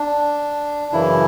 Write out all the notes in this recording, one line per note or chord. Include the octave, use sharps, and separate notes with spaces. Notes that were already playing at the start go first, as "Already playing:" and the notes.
Already playing: D4
F#2 C#3 E3 E4